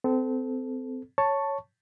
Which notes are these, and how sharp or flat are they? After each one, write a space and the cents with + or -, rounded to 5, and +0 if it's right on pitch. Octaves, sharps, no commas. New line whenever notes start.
C4 -25 A4 -10
C#5 +0 A5 +5 C#6 +0